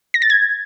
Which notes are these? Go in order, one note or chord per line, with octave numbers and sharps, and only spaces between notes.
A#6
A6
G#6